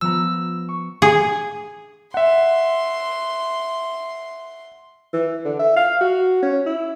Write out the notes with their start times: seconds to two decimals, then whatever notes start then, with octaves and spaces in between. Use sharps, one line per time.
0.01 F3 B3 A#5 E6
0.69 C#6
1.02 G#4
2.14 E5 F#5 C6
5.14 E3
5.45 D3
5.59 E5
5.77 F5
6.01 F#4
6.43 C#4
6.66 E4